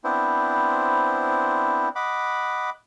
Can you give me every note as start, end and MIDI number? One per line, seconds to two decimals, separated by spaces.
0.04 1.89 59
0.04 1.89 60
0.04 1.89 62
0.04 1.89 64
0.04 1.89 72
1.96 2.70 75
1.96 2.70 78
1.96 2.70 83
1.96 2.70 86